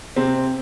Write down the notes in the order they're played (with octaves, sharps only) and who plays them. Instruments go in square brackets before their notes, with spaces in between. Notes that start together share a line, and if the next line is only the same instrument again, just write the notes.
[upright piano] C3 C4